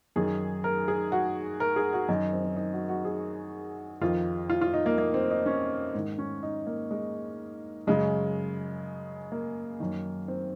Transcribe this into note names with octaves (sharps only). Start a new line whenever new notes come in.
F#2 D#3 G#4
A#4
G#4
F#4
A#4
G#4
F#4
F#2 D#3 D#4
C4
C4
D#4
F#4
F#4
G#4
F2 D#3 F4
F4
F4
D#4
A#3
A#3
C4
D#4
C#4
G#2 D#3
C#4
D#4
A#3
G#3
F#2 C#3 G#3
A#3
F#2 D#3
C4